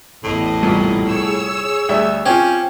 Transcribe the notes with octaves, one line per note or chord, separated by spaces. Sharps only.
A1 E2 A2 D#5
C2 G2 A#2
G#4 C#5 E6
D2 G3 E5
C4 C#4 F4 G4